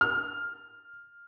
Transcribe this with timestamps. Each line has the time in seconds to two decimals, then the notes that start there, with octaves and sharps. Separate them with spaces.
0.01 F6